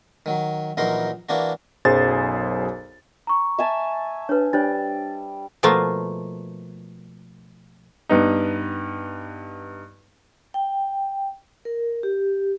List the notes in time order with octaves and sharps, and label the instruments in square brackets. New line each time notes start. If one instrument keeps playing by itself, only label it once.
[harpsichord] D#3 F#3
A#1 E3 F#3 D#4 A#4 C6
E3 A#3 D4 F#4
[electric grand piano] B1 F#2 G#4 C5 G#5 A6
[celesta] A#5 C#6
[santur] E5 G#5 A5
[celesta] D4 [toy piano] B4 C#5
[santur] G3 [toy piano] D4 C5 C#5 [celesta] A6
[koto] B2 F3 A3 A#3 F4
[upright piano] G2 B3 D#4
[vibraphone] G5
A#4
G4